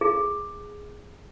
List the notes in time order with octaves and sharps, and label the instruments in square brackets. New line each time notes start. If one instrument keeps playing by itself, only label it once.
[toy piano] G#4